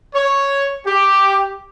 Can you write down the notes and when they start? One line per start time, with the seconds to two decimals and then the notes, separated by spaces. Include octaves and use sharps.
0.16 C#5
0.87 G4